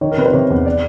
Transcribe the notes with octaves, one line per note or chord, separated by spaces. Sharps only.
D#3 C#5
A#4
C3 B4
C5
C3 C#5
E2
D5